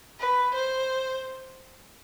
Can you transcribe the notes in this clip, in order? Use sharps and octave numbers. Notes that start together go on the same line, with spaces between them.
B4
C5